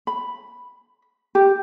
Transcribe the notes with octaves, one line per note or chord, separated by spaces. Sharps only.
B5
G4